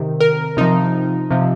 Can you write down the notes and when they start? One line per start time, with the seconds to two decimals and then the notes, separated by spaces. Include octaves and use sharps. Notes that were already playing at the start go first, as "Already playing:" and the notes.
Already playing: C3 D#3
0.21 A#4
0.57 C3 F3 D#4
1.31 C3 F3